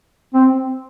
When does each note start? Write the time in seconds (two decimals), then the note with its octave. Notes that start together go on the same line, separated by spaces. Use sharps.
0.34 C4